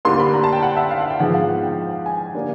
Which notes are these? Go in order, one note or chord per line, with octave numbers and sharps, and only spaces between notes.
D2 D3 G3 A#3 C6
B5
A#5
A5
G5
F#5
E5
F5
F#5
G5
G#2 F3 G#3 B3 F#5
F5
F#5
G5
G5
G#5
D3 G3 A#3